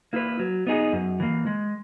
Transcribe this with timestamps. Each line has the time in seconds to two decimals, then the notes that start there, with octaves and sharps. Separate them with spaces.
0.13 A#3 E4 B4
0.39 F#3
0.67 B3 D#4 G#4
0.92 F#2
1.20 E3 A#3
1.47 G#3